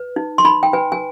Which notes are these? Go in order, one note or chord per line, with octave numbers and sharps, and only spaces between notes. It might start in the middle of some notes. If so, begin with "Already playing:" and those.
Already playing: B4
D#4
C6
D#4 B5
G5
B4 G#5
G#5